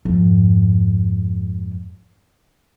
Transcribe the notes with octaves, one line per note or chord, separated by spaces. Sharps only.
F2 G#2